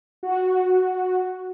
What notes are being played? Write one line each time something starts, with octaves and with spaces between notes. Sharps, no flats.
F#4